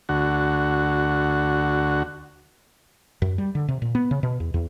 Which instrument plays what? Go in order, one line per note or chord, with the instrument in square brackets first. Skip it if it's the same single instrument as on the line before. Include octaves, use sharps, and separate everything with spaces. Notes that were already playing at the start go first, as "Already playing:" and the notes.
[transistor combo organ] D2 F#4
[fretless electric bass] F#2
G3
D3
C3
A#2
B3
C#3
B2
E2
E2